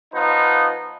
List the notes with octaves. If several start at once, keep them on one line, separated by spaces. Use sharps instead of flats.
F3 B3 D#4